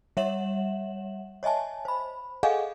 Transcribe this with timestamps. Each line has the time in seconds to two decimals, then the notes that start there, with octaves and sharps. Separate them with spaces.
0.17 G3 C#5 E5 F#5 E7 F#7
1.43 C#5 D#5 E5 G#5 A5
1.85 C5 B5
2.43 G#4 A4 D#5 F5 F#5 G#5